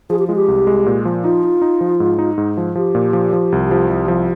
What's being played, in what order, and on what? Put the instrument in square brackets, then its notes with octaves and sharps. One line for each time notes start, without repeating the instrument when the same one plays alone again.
[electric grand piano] F3 [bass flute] G#4
[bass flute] G4
[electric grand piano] G#3 [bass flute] F4
[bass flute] G4
[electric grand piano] C2
G#3
A#2
F3
[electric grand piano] D#4 [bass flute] F4
[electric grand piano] D#4
D#4
F3
G#2
D#4
G#2
F3
[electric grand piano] F3 [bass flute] G4
[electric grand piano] A#2
F3
F3
C2
F3
C2
F3